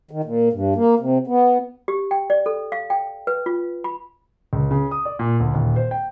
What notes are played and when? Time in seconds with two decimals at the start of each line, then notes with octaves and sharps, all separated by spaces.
0.11 D#3
0.24 A#2
0.53 G2
0.76 A#3
1.00 C3
1.27 B3
1.88 G4
2.11 G5
2.30 D5
2.46 A4
2.72 F5
2.90 G5
3.27 B4
3.46 F4
3.84 B5
4.53 C#2
4.71 C#3
4.91 D#6
5.05 D5
5.19 A#2
5.40 D2
5.54 D#1
5.76 C5
5.91 G5